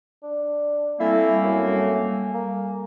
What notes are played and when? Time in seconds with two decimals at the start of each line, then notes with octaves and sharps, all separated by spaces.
0.23 D4
1.00 G3 A3 A#3 C4 E4 A4 G#5
1.44 F#2
2.34 A#3